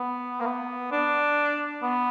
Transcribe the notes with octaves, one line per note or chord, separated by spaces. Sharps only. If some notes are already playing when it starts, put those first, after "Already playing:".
Already playing: B3
A#3
B3
D4
B3